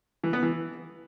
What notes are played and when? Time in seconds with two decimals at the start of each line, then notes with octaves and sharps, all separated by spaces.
0.24 E3
0.33 B3
0.43 E3